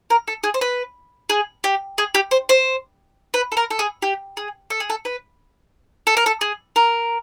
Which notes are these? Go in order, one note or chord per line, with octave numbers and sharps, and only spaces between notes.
A#4
A4
G#4
C5
B4
G#4
G4
G#4
G4
C5
C5
B4
A4
A#4
A4
G#4
G4
G#4
A4
G#4
A4
B4
A4
A#4
A4
G#4
A#4